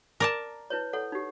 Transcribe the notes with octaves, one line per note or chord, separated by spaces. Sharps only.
A#4 D5 A5
E4 B4 C#5
A4 C#5 F#5
D#4 G4